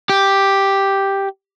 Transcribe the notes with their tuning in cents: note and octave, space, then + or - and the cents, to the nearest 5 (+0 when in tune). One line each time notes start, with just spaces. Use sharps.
G4 +0